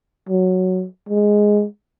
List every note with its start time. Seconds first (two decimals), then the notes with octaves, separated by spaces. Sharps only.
0.29 F#3
1.09 G#3